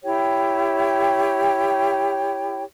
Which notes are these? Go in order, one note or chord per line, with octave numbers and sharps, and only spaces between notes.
E4 G4 C#5 G5